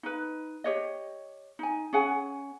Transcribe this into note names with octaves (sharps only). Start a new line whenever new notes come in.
D#4 B4
G4 C#5 D#5
D#4 G#5
C#4 G#4 F#5 G#5